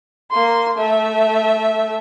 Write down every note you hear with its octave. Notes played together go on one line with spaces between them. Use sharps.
A#3 C6
A3 E5